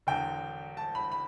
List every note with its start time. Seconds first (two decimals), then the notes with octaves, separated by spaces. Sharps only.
0.07 E1 E2 D3 G5
0.77 A5
0.95 B5
1.12 B5